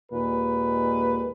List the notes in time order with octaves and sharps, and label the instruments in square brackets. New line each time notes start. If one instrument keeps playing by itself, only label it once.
[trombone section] D#2 A#2 G#3 B4